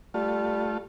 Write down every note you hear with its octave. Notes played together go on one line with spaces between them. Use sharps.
G3 A3 F4